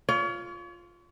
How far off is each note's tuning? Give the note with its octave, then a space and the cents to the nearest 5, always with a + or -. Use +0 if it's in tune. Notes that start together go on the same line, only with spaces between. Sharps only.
F4 +0 C#5 +40